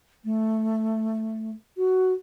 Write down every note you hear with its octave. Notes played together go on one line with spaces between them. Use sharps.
A3
F#4